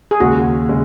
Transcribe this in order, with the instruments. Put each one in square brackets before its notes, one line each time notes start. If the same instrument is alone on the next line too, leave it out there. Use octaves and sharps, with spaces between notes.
[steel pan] G#4
[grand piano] D#2 C#3 G#3 [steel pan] F#4
[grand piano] C#3 G#3